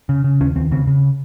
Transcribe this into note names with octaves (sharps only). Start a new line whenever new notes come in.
C#3
C#3
D#2 C#4
D#2 C4
C#3 C4
C#3